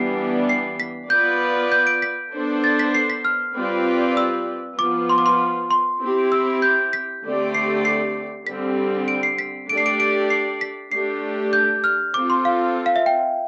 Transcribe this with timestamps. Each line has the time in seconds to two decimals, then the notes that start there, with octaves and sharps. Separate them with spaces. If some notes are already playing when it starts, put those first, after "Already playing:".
Already playing: E3 G3 B3 D4 C7
0.49 C7
0.80 B6
1.10 B3 F4 B4 D5 G6
1.72 G6
1.87 D7
2.02 B6
2.33 B3 D4 A4 C5
2.64 A6
2.79 B6
2.94 C7
3.10 B6
3.25 F6
3.55 G3 C4 F4 B4 D5
4.17 E6
4.78 F3 B3 F4 D6
5.09 C6
5.18 D6
5.26 C6
5.71 C6
6.01 C4 E4 G4
6.32 E6
6.62 G6
6.93 B6
7.23 D3 A3 C4 G4 D5
7.54 C7
7.85 C7
8.47 D3 G3 C4 B6
9.08 D7
9.23 C7
9.39 B6
9.68 A3 D4 G4 D5 D7
9.77 C7
9.86 D7
10.00 D7
10.30 C7
10.61 B6
10.92 A3 D4 G4 C7
11.53 G6
11.84 F6
12.14 C4 F4 A4 D6
12.30 C6
12.45 F5
12.86 F5
12.96 E5
13.06 G5